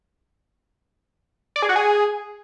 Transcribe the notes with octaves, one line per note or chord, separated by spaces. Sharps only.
D5
G#4
F#4
G#4